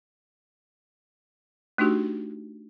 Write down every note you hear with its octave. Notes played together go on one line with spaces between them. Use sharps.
A3 D4 D#4 F#4 G4